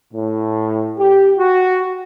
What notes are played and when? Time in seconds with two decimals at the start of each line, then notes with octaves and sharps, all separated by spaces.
0.13 A2
0.97 G4
1.37 F#4